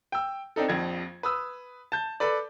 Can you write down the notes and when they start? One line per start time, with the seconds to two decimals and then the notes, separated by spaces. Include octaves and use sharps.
0.12 G5 E6
0.56 C4 D4 D#4 A4
0.68 A#1 F2 F3 G#6
1.23 B4 D#6 E6
1.92 A5 G6
2.20 A4 B4 D5